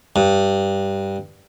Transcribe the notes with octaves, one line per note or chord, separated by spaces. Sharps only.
G2